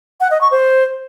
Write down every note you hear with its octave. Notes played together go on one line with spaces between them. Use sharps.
F#5
D#5
C#6
C5